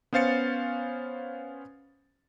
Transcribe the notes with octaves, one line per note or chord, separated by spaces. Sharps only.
B3 C#4 C5 F5 A6 C#7